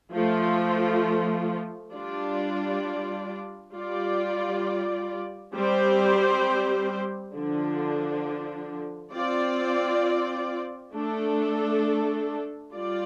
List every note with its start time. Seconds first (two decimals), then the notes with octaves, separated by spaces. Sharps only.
0.13 F3 A3 F4
1.93 G3 D4 F4 D5
3.73 G3 F4 D5
5.53 G3 C4 G4 C5
7.33 D3 F3 D4
9.13 C4 F4 D5
10.93 A3 D4 A4
12.74 G3 F4 D5